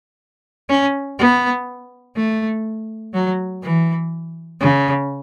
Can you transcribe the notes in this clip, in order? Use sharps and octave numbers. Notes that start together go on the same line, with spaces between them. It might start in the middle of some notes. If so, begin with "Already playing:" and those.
C#4
B3
A3
F#3
E3
C#3